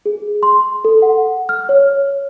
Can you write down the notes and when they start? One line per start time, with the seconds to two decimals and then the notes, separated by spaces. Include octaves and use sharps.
0.06 G#4
0.43 C6
0.85 A4
1.02 F#5
1.49 F6
1.69 C#5